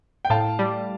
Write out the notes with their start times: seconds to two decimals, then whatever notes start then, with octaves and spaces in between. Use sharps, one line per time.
0.25 G5
0.30 A2 F5 A5
0.59 G3